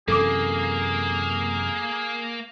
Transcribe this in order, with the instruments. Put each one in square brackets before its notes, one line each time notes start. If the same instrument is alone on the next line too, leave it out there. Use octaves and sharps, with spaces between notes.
[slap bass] F#2 C3 E3 [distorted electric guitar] A#3 [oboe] G#4 [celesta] A4 D6